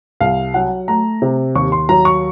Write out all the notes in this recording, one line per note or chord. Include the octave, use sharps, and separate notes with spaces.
C2 F5
F#3 F#5
A3 A#5
C3
D#2 C#6
C6
F#3 A#5
C#6